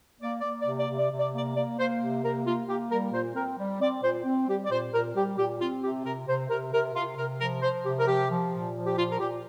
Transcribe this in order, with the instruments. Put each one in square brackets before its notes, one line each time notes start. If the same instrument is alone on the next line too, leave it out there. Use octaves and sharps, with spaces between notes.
[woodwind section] A#3 D5
A#3 D5
D5
C3
D5
C3
D5
C3
D5
A#3 D5
A#3 D5
A#3 C5
C3
A#3 A#4
A#3 F4
A#3 G4
G3 A#4
A#2 C5
C4 A#4
G3
C4 D5
A#2 C5
C4
G3 G4
D5
A#2 C5
A#2 A#4
G3 G4
A#2 G4
C4 F4
C3 G4
C3 A#4
C3 C5
C3 A#4
C3 A#4
C3 F4
C3 A#4
F3 A#4
F3 C5
C3 G4
A#4
F3 G4
F3
A#2
F3
G4
A#2 F4
A#4
A#2 G4